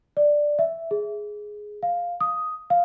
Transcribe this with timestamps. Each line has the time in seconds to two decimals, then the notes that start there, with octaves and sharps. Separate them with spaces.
0.17 D5
0.59 E5
0.91 G#4
1.83 F5
2.21 D#6
2.70 F5